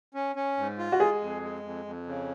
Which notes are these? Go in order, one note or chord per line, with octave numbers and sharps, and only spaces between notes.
C#4
C#4
G#2
F4
F#4
G#3 G#4
F2
G#3
F2
F2
C#3